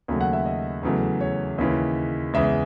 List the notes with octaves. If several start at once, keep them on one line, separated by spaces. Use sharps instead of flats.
D#2 C#3 F#3 A3
F#5
E5
D#5
E2 C#3 F#3 A3
C#5
D#2 C#3 E3
E2 C#3 G#3 E5